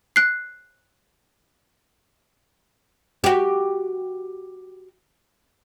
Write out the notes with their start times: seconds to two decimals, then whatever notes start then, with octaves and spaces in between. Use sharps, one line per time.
0.16 F#6 C7
3.24 F#4 G4